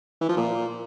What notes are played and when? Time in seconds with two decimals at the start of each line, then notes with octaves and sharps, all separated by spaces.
0.21 E3
0.29 F3
0.37 A#2